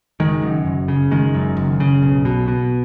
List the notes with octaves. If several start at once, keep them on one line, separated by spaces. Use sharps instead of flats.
F#1 D#3 G#3
F#2
F#1
C#3
F#1 D#3 G#3
F#2
F#1
C#3
B1
B2
B2